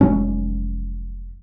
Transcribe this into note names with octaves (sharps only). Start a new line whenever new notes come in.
F1 F#3 G#3 C#4